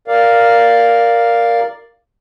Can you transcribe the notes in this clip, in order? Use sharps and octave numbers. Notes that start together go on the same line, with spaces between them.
A#4 D5 F5